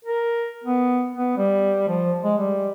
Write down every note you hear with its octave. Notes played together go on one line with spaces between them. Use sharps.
A#4
B3
B3
G3
F3
G#3
G3